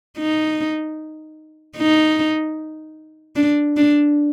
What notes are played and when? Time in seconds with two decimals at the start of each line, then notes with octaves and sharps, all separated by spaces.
0.18 D#4
1.77 D#4
3.36 D4
3.77 D4